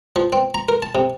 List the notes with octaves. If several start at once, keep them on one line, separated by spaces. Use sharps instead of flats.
F3
C4
A#5
A#4
A5
C3